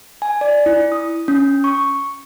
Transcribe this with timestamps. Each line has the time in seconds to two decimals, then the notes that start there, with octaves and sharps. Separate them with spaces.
0.22 G#5
0.41 D5
0.66 E4
0.92 D#6
1.28 C#4
1.64 C#6